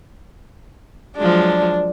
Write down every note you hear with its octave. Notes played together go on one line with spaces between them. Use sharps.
F3 F#3 G#3 D4